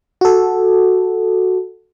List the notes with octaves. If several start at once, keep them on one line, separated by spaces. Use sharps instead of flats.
F#4 A4